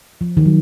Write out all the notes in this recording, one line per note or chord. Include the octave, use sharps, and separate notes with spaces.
F3
D#3
F#3